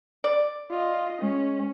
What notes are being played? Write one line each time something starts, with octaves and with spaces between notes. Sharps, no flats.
D5
F4 D#5
G#3 C#4